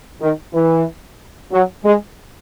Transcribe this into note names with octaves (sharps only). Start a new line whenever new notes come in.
D#3
E3
F#3
G#3